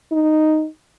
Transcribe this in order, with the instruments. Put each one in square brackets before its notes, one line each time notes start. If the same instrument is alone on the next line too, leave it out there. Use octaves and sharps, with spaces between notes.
[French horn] D#4